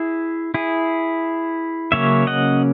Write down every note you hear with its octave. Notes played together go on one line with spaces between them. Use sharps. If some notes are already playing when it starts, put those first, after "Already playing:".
Already playing: E4 G#4
E4 G#4
C#3 F#3 A#3 C#4 C#5 E5
D#5 F#5